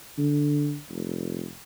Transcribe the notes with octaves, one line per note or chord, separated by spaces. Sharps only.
D3
F1